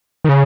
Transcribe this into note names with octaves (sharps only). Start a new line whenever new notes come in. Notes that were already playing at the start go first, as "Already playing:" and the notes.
D#3
C#3